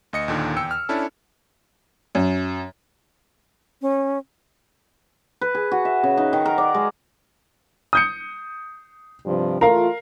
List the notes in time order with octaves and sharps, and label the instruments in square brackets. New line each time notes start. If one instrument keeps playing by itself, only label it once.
[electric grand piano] D2 D#5 C#7
D#2 A#2 D3 D#3
E2 G5 E6 C#7
F6
C#4 D4 E4 A4
[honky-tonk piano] F#2
[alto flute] C#4
[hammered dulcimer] B4
G#4
F#4
E5
C#3
D#4
D#3
A#4
D5
G#3
[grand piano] D#6 G6 C#7
[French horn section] G2 C3 F3
[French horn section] E3 A3 F4 [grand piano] A#4 F5